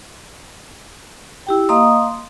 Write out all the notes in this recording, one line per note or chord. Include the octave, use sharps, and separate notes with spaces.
E4 G4 G5
A#3 D#5 F5 A#5 C6 D#6